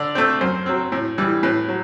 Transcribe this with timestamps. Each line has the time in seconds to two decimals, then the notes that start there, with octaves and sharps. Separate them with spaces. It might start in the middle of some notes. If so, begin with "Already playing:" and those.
Already playing: D3 D5
0.15 A3 C4 C5
0.41 F#2 C5
0.66 F#3 C4
0.92 A2
1.18 E3 G3
1.43 A2 B4
1.69 F#3